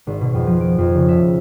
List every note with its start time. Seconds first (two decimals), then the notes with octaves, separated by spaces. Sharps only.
0.07 G#1
0.21 B2
0.33 F2
0.47 F3
0.61 D7
0.78 F2
0.94 C#3
1.08 E5